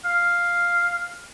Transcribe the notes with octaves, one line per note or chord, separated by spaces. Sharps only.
F5